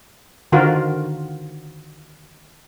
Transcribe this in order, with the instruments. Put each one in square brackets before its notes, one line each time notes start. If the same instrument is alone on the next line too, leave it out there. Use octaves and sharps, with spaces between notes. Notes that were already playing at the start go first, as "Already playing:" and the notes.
[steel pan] D3 D#3 F4 F#4 A#4 C5